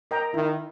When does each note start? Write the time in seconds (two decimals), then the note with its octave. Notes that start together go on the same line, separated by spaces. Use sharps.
0.11 A#4 D#5 G5 A#5
0.34 D#3 E4